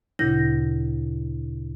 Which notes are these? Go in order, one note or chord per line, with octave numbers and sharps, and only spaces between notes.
D2 A#2 C#3 E4 G6 A#6